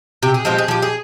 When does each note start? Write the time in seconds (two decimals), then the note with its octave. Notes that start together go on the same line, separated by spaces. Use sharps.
0.23 C3 G4
0.34 G#4
0.45 F3 G#3 C4 G4
0.58 G#4
0.68 F3 G4
0.82 G#4